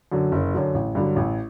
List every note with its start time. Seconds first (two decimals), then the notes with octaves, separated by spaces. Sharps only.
0.12 F#2 D3 F#3
0.32 F#1
0.54 F#2 D3 F#3
0.74 A1
0.95 G2 D3 F#3
1.16 A1